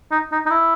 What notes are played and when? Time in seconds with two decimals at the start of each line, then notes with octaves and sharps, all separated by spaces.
0.12 D#4
0.32 D#4
0.46 D#4
0.50 E4